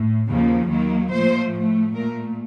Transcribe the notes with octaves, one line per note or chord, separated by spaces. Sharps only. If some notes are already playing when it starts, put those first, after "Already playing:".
Already playing: A2
D#2 C#3 F3 A#3
D#2 D#3 F#3 A#3
A#2 F3 A3 C5
A2 A3
A#2 A3 A#4